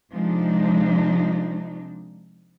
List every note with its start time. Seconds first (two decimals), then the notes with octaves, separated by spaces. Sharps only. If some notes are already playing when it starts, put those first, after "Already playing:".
0.11 C3 F3 G#3 D4 D#4